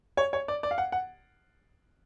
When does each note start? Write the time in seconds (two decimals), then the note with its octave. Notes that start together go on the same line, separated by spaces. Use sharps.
0.17 C#5
0.33 C#5
0.48 D5
0.63 D5
0.71 F5
0.78 F#5
0.92 F#5